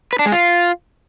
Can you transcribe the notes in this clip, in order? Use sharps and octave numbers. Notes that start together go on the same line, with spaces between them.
B4
D4
G#3
F4